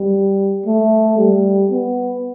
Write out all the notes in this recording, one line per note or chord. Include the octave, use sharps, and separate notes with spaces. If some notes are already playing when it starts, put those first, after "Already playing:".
Already playing: G3
A3
G3
B3